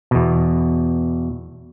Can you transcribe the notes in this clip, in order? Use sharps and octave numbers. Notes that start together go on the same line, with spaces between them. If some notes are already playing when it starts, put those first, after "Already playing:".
E2 B2